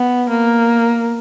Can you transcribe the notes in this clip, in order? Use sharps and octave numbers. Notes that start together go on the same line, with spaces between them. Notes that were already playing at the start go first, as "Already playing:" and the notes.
Already playing: B3
A#3